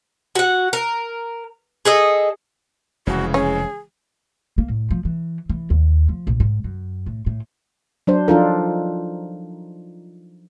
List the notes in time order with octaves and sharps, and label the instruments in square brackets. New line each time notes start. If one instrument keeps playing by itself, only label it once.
[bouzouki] F#4 F#5
A#4
G#4 A4 D#5
[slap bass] F1 [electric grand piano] C#3 E3 G#3 [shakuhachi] F#4
[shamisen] C#4 [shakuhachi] G#4
[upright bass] A#3
A2
F3
E3
E3
D#2
F3
A#1
G#2
F#2
A2
A2
[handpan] F#3 D4 C5
F3 D4 D#4 F4 A4 A#4